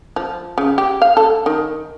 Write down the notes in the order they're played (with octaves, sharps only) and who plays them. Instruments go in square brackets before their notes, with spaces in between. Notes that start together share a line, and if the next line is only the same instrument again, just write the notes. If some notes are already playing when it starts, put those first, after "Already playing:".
[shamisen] F3
C#3
G4
F5
A4
D#3